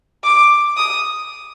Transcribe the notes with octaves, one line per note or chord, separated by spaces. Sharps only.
D6
D#6